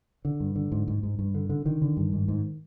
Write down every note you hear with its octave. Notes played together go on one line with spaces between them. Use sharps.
D3
G2
D3
G#2
G#2
G#2
G2
D3
D3
D3 D#3
D3
G2
G#2
G#2